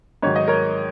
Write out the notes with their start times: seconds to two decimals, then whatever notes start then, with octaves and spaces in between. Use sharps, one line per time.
0.22 G#2 D#3 F#3 C#5
0.36 D#5
0.48 A#4 C#5